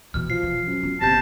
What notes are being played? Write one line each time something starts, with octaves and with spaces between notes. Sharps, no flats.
B2 E3 F6
F3 C7
E3
F#2
C#4 F4
G1 C3 A5 G6 A#6